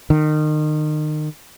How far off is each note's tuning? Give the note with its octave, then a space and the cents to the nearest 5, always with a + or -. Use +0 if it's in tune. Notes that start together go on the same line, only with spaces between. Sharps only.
D#3 -30